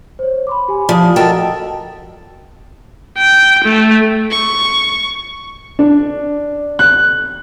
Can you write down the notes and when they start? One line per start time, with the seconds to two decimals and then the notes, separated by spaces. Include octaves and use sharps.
0.19 C5 C#5
0.47 B5 C6 D6
0.68 G4 G#5
0.89 F3 D5 A5 D#6
1.16 F#4 A4 A#4 D#5 F#5 G5
3.18 G5
3.64 A3
4.31 C#6
5.79 D4
6.79 F#6